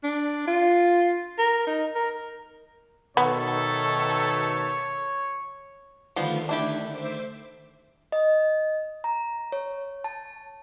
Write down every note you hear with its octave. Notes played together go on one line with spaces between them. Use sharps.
D4
F4
A#4
D#4
A#4
B2 D#3 A3 B3 A4 C#5
D3 D#3 F3 G3 A3 B3
D4 E4 G4
C5 E5 D6
D#5
A#5
C#5
A5